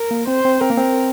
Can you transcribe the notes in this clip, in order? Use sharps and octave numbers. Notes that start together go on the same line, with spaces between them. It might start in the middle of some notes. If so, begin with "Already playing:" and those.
Already playing: A#4
A#3
C4 C5
C4
C4 A#4
A#3
C4